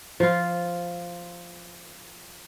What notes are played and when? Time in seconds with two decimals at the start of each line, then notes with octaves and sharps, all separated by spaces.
0.20 F3 F4